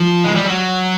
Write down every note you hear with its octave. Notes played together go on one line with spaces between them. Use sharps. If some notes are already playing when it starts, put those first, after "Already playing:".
Already playing: F3
G#3
G3
F#3